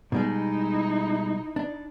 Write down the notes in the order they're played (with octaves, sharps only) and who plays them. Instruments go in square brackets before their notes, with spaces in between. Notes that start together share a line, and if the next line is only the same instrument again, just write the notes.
[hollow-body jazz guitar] B2 G3 G#3 [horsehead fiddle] D#4 E4
[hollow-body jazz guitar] D4